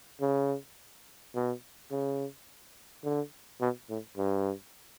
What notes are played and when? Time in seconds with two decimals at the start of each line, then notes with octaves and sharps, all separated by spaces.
0.21 C#3
1.35 B2
1.91 C#3
3.04 D3
3.61 B2
3.89 A2
4.17 G2